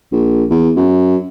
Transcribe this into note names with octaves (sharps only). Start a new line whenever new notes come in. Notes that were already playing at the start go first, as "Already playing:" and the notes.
A#1
E2
F#2